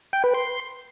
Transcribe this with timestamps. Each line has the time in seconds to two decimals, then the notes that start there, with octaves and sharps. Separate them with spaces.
0.13 G5
0.24 B4
0.34 C6